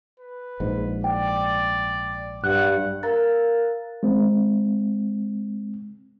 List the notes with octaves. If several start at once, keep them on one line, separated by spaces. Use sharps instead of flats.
B4
A#1 G#2
D5 G5
G2 F#5 F#6
A#4 F5 A#5 F#6 A6
G#3 C4